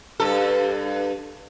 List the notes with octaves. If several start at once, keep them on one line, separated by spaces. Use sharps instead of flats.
G2 A4